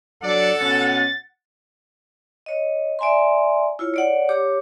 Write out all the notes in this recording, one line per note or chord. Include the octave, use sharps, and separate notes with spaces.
F#3 D4 A4 D5 F#5
B2 C#4 A6
C#5 D#5
D5 E5 G#5 A#5 C6
E4 F4 C#5
C#5 D5 F#5
G4 C#5 D6